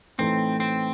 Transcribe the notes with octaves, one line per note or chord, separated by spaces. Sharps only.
A2 E3 A3 C4 D#4
C4